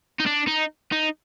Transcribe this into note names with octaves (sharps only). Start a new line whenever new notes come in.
D#4
D4
D#4
D#4